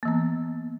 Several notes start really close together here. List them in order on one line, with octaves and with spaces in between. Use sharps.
A#3 E3 B3